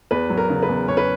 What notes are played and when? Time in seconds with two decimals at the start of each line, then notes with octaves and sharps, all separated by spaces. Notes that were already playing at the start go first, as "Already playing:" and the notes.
0.11 E2 B4
0.30 F#3
0.37 A#4
0.50 C#3
0.62 B4
0.69 E2
0.88 E2 C#5
0.97 B4